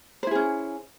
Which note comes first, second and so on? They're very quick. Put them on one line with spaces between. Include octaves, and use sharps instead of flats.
C5 E4 G#4 C#4